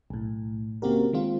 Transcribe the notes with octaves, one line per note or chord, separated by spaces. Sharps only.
B1 A2
C#3 A#3 C4 F#4 G4 A#4
D#3 G#3 C4 F4